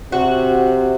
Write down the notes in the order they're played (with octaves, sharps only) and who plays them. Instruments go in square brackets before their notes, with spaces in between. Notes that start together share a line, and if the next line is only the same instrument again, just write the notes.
[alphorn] C3 [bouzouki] F#4